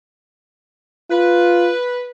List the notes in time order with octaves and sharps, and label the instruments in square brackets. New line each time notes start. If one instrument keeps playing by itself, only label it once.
[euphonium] F4 [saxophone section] B4